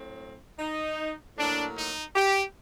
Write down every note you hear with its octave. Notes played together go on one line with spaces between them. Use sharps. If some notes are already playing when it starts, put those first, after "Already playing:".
Already playing: A2 F#3 C4
D#4
A2 F#3 A#3 D4
D#4
G4